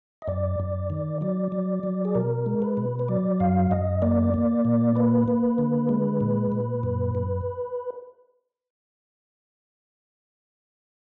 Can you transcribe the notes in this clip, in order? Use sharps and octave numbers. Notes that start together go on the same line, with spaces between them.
D#5
F#2 D5
F#2
D#3
F#3 D5
F#3
F#3
G#4
B2 A#4
G#3
B4
B2
B4
F#3 D5
F#2 F5
F#2 D#5
A#3 D5
A#3
A#2
A#3 B4
A#3
D3
G#3
A#2
A#2
F#2
F#2